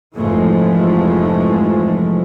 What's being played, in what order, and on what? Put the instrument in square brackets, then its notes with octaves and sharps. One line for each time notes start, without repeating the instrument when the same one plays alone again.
[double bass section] F1 G#2 E3 F3 G#3 A3